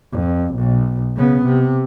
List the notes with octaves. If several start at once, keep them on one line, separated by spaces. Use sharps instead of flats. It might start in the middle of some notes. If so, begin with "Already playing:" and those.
F2
B1
C#3 B3
C3